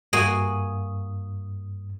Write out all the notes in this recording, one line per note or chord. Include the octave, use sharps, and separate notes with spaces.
G2 A#3 F#4 G#5 D#6